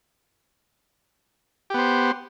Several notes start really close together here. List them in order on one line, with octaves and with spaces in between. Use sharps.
G4 B3 C5